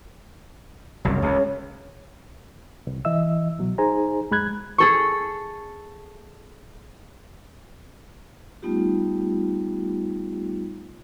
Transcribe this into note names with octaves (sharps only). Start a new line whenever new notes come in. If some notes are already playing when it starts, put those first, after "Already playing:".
F#1 C2 F#2
C#2 C#3
C2
E3 D#5 E5 E6
C2 B2 F#3
D#4 G#4 C5 G#5 A#5
F#2 G#3 B5 F#6 G#6
G#4 A4 C#6
G3 A3 B3 D#4 F4 G4